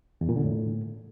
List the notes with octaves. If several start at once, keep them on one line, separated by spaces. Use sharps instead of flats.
E2
A#2
D3
A2